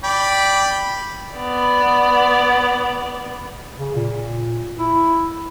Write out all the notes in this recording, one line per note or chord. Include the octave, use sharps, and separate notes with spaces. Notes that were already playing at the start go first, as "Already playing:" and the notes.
D5 G5 B5
B3 D5
C#3
A#2
E4